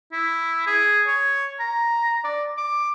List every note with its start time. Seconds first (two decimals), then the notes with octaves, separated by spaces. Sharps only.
0.12 E4
0.67 G#4
1.07 C#5
1.60 A#5
2.24 D5
2.58 D6